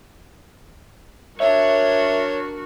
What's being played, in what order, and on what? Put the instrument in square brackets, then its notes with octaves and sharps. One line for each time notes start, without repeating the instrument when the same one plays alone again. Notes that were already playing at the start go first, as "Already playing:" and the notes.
[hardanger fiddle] D4 [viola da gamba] F#4 A#4 [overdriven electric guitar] C#5 [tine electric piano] E5